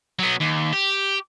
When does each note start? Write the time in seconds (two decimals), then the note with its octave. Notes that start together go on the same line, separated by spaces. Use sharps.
0.19 F#3 B3
0.40 D#2
0.73 G4